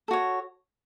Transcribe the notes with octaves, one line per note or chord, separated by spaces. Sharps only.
F#4 A4 C#5